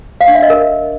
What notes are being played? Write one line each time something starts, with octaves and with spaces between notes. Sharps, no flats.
F5
D4
E5
D#5
A#4